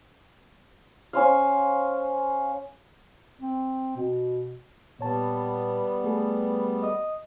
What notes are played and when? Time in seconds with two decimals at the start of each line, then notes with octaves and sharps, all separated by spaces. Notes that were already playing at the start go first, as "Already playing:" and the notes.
1.13 C#4 C5 F5
3.41 C4
3.96 B2
4.99 A#2 G3 B3 C#5 A5
6.04 A3 G#4 A4
6.83 D#5 D#6